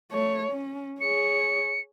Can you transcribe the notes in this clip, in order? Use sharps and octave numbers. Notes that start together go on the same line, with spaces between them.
A3 C#5
C#4
G#4 C#5 C#7